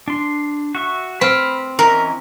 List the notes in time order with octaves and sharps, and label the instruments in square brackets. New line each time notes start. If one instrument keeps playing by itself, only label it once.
[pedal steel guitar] D4 C6
F#4 E5 C#6
[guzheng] C4 [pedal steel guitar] B5 F6
[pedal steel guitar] E3 C#4 D#5 [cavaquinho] A#4